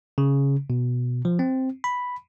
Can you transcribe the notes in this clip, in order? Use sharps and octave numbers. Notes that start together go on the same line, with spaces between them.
C#3
B2
F3
C4
B5